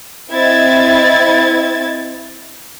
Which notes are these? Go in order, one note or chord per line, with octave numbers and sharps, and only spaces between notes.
C4 E4 D#5 G#6 A6